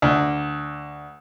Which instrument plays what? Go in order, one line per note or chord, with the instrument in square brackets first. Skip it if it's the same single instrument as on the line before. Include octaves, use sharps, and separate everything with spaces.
[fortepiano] D2